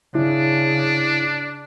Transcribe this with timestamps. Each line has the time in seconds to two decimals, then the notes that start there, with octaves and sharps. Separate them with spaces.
0.15 C#3 D4 E4